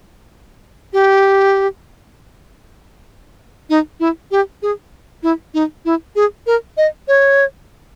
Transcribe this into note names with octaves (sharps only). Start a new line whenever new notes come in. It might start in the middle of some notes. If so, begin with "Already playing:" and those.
G4
D#4
E4
G4
G#4
E4
D#4
E4
G#4
A#4
D#5
C#5